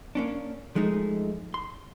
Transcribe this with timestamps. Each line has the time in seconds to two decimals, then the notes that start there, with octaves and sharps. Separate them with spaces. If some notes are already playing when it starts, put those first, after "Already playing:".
0.15 A#3 C#4 D4
0.75 F3 G#3 A3 D#4
1.54 C6